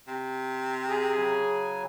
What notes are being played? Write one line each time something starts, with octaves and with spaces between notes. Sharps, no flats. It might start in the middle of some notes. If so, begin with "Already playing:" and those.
C3
G#4 A#5
C#3 F#3 G#5